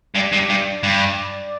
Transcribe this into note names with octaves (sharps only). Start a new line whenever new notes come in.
G2 D5
G2
G2
G2